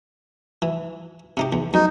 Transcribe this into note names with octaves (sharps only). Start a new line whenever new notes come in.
E3
C3 D#4 G4
E2
F#2 D#4